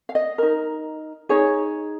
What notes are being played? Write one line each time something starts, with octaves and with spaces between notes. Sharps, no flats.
F5
D#5
D#4 A#4
D#4 G#4 C#5